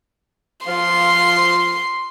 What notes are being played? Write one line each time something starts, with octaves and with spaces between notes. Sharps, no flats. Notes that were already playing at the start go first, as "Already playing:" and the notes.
F3 F4 C6